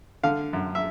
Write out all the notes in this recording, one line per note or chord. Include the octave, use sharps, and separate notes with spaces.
D3 F5
F#2
E5